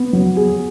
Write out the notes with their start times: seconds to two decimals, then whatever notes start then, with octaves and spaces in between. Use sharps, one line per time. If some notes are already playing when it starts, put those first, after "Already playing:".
Already playing: B3
0.13 F#3
0.36 G#4